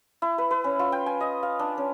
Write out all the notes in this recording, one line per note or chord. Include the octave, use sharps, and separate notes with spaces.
E4
B4
B4
C#4
F4
G5
G#5
D#5
F5
D4
C#4